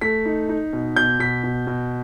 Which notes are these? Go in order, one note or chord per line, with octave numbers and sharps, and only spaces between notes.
A3 B6
D#4
D#4
B2
B2 G6
B2 B6
B2
B2